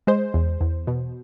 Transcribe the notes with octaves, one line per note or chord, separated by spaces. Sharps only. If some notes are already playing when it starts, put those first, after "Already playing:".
G#3 C5
E2
E2
B2